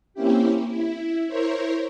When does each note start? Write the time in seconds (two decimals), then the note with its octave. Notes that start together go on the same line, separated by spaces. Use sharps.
0.14 A#3 C4 C#4 E4 G4
0.69 E4
1.27 E4 A#4 C5 C#5